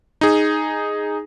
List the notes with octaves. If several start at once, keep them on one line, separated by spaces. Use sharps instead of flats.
D#4 G#4